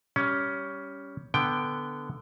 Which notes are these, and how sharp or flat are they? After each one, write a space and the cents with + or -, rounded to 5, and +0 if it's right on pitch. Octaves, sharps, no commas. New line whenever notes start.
G3 +0 C#4 +15
D3 +0 B3 +0 G5 +0